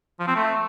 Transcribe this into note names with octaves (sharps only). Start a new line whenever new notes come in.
F3
C4
A3